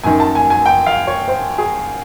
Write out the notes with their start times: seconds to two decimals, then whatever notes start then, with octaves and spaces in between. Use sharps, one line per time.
0.03 F#2 D#3 G#5
0.20 A5
0.35 G#5
0.50 G#5
0.66 G5
0.86 F5
1.07 C#5
1.28 C5
1.58 G#4